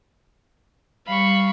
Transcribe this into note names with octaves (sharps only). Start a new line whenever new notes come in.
G3 F5 B5 C#6